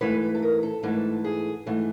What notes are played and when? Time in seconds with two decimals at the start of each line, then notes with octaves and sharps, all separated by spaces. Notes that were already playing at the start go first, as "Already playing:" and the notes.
0.01 G#2 E3 A3 B4
0.35 A4
0.42 A#4
0.63 A4
0.83 G#2 E3 A3 A4
1.24 G#4
1.66 G#2 E3 A3